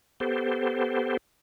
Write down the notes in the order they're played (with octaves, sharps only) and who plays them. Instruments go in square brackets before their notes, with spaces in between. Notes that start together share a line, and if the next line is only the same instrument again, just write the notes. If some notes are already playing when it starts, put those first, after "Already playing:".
[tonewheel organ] B3 G4 A4 C5